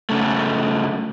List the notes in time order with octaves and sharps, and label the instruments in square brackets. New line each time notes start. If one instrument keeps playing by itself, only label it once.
[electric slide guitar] F#2 C#3 A3